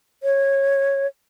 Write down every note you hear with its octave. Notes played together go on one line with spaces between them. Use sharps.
C#5